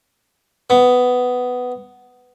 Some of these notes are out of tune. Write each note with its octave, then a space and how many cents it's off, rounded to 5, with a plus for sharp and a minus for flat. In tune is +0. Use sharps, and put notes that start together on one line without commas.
B3 +10